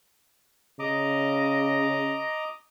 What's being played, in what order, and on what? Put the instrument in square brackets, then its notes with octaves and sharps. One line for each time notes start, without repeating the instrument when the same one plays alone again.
[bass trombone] C#3 [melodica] D#5 A#5 D6